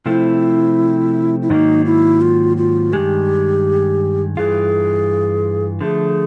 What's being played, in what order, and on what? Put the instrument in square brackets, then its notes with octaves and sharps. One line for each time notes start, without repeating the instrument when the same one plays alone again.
[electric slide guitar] C3 F3 A3 C4 [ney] E4
[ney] E4
[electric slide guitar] G#2 D#3 F#3 A#3 [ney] D#4
[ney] E4
F4
F4
[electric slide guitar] G2 D#3 G#3 [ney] G4
[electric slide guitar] G2 E3 F4 [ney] G#4
[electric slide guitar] D3 F3 A3 [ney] G#4